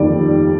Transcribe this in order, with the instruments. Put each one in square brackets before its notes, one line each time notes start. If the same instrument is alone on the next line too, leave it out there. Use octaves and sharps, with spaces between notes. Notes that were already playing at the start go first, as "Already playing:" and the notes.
Already playing: [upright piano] G1 F2 D#3 G3 A#3 D5